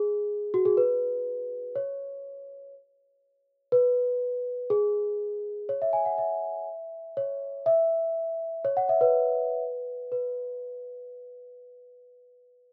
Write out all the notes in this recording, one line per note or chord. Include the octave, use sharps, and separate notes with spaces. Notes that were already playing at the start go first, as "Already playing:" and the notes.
Already playing: G#4
F#4
G#4
B4
C#5
B4
G#4
C#5
E5
G#5
F#5
E5
C#5
E5
C#5
F#5
E5
B4
B4